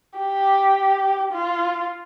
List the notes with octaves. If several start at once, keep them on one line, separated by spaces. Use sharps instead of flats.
G4
F4